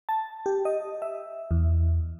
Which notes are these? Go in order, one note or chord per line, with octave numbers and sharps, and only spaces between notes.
A5
G4
D#5
E5
E2